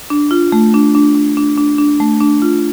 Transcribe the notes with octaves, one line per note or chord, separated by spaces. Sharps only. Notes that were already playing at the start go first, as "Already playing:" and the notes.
D4
F4
A3
D4
D4
D4
D4
D4
D4
A3
D4
F4